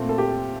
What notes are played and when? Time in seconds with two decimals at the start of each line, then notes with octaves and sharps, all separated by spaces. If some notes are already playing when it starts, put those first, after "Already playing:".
Already playing: A#2 A3 C4
0.09 A4
0.18 G4